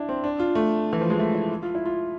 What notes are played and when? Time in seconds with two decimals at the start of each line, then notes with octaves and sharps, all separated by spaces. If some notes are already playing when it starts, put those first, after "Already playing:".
Already playing: D4 E4
0.09 C4
0.24 D4
0.39 F4
0.55 A3
0.93 E3
1.01 F3
1.10 G#3
1.19 A3
1.35 E4
1.63 F4
1.75 E4
1.86 F4